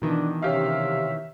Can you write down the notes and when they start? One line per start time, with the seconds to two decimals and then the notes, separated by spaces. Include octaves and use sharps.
0.02 B2 D#3 E3 D4
0.42 C3 C#4 G4 E5 F5